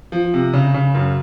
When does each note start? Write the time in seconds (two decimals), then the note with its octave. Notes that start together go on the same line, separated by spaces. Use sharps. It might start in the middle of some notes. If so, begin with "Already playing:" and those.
0.12 F3
0.34 C3
0.53 C#3
0.74 C#3
0.95 F#2